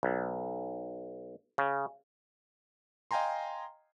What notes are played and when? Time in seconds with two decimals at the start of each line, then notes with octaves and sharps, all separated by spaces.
0.03 B1
1.58 C#3
3.11 D#5 F5 G5 G#5 A#5 C6